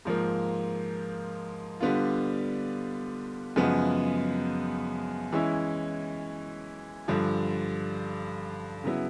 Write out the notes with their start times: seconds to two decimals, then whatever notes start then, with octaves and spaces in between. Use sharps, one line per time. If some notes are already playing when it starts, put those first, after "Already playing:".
0.05 G#2 F3 A#3
1.81 D3 G3 B3 D4 F4
3.56 F#2 C#3 F3 G#3 B3
5.32 E3 G#3 C#4 E4
7.08 G2 D3 F3
8.84 C#3 F#3 B3 E4